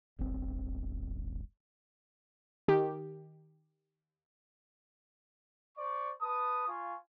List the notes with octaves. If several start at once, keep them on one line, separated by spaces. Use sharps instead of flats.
D1 G1 C4
D#3 G4
C5 D5 C#6
B4 A5 D#6
F4 F5 G#5 C#6